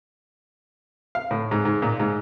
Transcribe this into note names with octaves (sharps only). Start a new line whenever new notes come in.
F5
A2
G#2
G#2
A#2
G#2